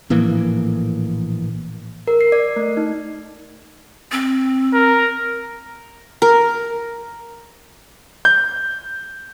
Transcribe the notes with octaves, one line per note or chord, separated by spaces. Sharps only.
A#1 A2 E3 A#3
A#4
C7
D5
A3
D#4
C4
A#4
A#4
G6